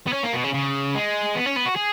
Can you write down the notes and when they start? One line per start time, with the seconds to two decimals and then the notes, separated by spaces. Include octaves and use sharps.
0.07 B3
0.13 C#4
0.24 A#3
0.33 B2
0.44 C#3
0.54 C#3
0.95 G#3
1.35 B3
1.46 C#4
1.56 B3
1.66 F#4
1.76 G#4